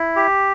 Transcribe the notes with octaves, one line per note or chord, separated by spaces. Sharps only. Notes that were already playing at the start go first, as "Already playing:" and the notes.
Already playing: E4
G4